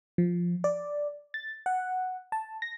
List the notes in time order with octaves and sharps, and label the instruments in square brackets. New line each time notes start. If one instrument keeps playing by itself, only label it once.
[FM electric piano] F3
D5
A6
F#5
A5
A#6